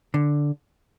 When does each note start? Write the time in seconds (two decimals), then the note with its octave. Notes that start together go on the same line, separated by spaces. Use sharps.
0.14 D3